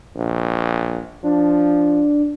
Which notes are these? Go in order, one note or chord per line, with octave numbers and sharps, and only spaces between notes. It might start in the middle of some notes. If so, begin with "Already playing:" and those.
A#1
F3 D4